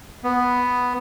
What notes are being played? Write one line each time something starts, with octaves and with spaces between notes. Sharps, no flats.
B3